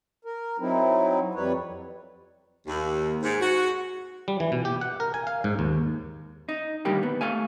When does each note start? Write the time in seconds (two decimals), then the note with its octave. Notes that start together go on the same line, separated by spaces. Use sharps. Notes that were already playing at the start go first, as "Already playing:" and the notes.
0.25 A#4
0.59 F#3 C4 D#4 E4
1.35 F2 G3 B4 C#5
2.67 D#2
3.23 G#2
3.41 F#4
4.28 G3
4.40 E3
4.52 B2
4.65 G4
4.81 F#5
5.00 A#4
5.14 G#5
5.27 F5
5.44 G#2
5.59 D#2
6.49 D#4
6.85 A2 D3 D#3 G3 A#3 G4
7.03 B3
7.21 A3 A4 F5 G#5